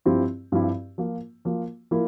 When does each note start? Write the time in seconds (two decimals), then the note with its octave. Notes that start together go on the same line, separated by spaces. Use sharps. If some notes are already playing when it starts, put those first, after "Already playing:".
0.05 G2 F3 C4 E4 G4
0.52 G2 F3 C4 E4 G4
0.98 F3 A#3 F4
1.45 F3 A#3 F4
1.91 F3 A#3 E4 A#4